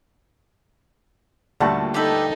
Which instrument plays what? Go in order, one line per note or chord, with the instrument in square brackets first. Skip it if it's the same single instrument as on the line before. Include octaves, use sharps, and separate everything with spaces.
[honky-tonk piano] D#2 A#2 A5 [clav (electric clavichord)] D3 G3 A3 [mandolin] F#4
[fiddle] D#4 A4 [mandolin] G4 B4 E5